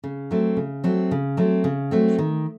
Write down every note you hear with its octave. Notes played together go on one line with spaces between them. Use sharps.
C#3
F#3 A3 C4
C#3
F#3 A3 C4
C#3
F#3 A3 C4
C#3
F#3 A3 C4
D#3